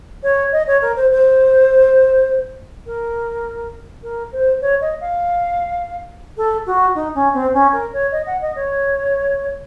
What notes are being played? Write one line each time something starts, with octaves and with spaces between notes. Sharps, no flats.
C#5
D#5
C#5
A#4
C5
C5
A#4
A#4
C5
C#5
D#5
F5
A4
F#4
D#4
C#4
C4
C#4
A#4
C#5
D#5
F#5
D#5
C#5